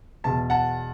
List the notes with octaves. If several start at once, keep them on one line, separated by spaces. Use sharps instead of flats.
E1 E2 B2 A5
F#5 A5